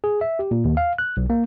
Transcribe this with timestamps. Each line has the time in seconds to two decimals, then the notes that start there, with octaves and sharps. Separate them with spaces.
0.04 G#4
0.21 E5
0.39 G4
0.51 A#2
0.65 D#2
0.77 F5
0.98 F#6
1.17 B1
1.30 A#3